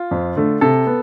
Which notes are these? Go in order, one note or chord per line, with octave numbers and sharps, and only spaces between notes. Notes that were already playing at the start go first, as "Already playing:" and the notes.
Already playing: F4
F2
D3 A3
C3 A4
B3